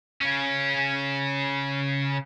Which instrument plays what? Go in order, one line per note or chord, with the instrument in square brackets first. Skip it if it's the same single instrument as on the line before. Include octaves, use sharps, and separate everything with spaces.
[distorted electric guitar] C#3 C#4